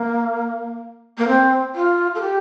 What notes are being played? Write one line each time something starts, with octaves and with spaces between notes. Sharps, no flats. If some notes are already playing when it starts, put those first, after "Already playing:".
Already playing: A#3
A#3
C4
F4
A4
G4